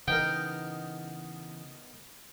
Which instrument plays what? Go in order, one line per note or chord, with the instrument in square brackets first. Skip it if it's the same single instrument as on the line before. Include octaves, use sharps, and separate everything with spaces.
[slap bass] C#3 E3 [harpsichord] B3 D#4 A#4 [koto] G5